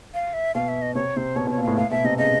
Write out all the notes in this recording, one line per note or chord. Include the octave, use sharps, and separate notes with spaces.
F5
E5
B2 F5
E5
D#5
C3 C#5
C3 C5
B2 C#5
B2
C#5
A#2
A2 F5
A2 F5
B2 E5
C3 D#5
C#3 D#5